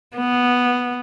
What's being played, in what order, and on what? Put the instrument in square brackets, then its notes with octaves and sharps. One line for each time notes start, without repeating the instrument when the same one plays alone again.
[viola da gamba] B3